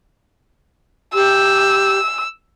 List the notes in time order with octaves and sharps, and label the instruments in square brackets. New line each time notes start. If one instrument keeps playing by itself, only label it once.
[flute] G4 [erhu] E6